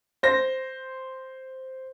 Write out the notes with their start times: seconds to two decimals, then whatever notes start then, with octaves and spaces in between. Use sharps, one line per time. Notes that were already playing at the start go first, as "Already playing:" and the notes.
0.23 C5 A#6